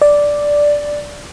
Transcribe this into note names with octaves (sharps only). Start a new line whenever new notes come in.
D5